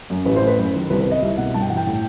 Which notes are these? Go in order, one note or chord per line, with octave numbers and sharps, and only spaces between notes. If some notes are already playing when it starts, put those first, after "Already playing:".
F#2
A1 B4
C5
A2
B4
F#2
D#3
C2 B4
B4
C3
D#5
C2 E5
B2 F#5
G2 A5
G5
E3 F#5
G5
A2